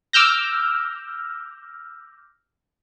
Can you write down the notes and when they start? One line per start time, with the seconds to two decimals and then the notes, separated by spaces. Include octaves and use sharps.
0.13 D6 E6 F6 G6 A#6